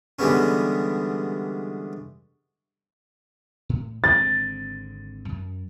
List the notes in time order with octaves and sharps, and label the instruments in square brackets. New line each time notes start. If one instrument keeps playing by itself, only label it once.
[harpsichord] D3 E3 G3 G#3 B3 C#4
[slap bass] A2
[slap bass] G#1 D3 C4 [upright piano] A6
[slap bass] F#2